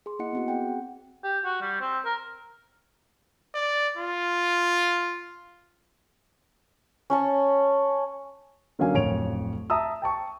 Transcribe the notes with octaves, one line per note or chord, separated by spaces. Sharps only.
G#4 C6
A#3 E4 D#5 F#5 C#7
B3 C4 F#4
G#4 F#5 G5
C4
G4
F#4
G3
C4
A#4
D5
F4
C#4 C#5 A5
D3 F#3 A#3 C#4 F5 G#5
D1 F2 C#5 D7 F7
E5 A5 A#5 D#6 E6
G5 A5 C#6